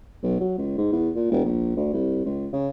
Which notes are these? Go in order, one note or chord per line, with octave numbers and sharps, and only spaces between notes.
B1
F#3
C#2
G#2
E2
A#2
E1
A#1
D2
C2
C#2
C#3